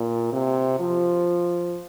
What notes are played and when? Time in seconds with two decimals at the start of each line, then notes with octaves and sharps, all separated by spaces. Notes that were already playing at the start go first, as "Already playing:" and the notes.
Already playing: A#2
0.33 C3
0.80 F3